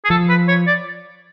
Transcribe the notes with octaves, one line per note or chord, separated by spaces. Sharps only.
G#4
F3 A4
B4
C#5
D5